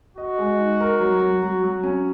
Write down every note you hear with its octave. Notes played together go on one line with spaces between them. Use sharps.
F#4 D#5
G#3
D#4
A#4
F#3
F#3
F#3
F#3
C#4